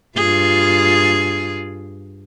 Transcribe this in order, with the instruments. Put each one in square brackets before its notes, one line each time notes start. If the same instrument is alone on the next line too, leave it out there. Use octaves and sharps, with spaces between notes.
[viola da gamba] G2 F4 G#4